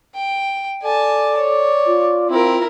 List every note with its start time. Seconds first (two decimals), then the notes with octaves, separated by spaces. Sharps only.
0.15 G5
0.83 A4 D5 G#5 A5
1.37 C#5
1.86 F4
2.30 C4 E4 A#4